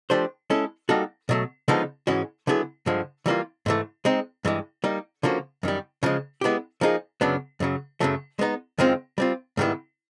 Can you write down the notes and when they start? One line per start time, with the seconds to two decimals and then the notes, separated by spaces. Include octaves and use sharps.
0.10 F3 A3 D4 G4 C5
0.50 G#3 C#4 E4 A4
0.89 G3 A#3 D#4 F#4 A4
1.29 B2 F#3 A3
1.68 D3 F3 G#3 B3 D#4
2.07 G#2 E3 G#3 C#4 F#4
2.47 D3 F#3 B3 E4 G#4
2.86 G2 D3 F3 G#3
3.26 E3 G3 A#3 D4 F4
3.66 G#2 E3 A3
4.05 G#3 C4 D#4
4.45 G2 E3 G#3
4.84 G3 A#3 D#4
5.23 D3 F3 A#3 C#4 F#4
5.63 F#2 D#3 G3
6.03 C#3 F3 G#3
6.41 G#3 B3 E4 G4
6.81 F3 A#3 D#4 G#4
7.21 F#2 C#3 F#3 B3 D4
7.60 F#2 C#3 F#3
8.00 F#2 C#3 F#3 A3
8.39 G#3 B3 D#4
8.78 F#2 D#3 G#3 C4 F4
9.18 G3 C4 F4
9.57 G#2 D#3 G3 B3 E4